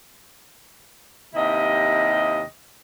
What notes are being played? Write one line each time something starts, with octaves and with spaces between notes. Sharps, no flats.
D#2 C3 E4 D#5